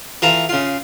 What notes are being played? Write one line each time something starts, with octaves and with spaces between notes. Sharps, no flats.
E3 F4 A4 A#5
C#3 F4